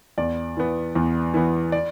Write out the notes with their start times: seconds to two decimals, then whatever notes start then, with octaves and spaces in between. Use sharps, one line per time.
0.18 E2 D5
0.57 E3 B3
0.95 E2
1.34 E3 B3
1.72 D5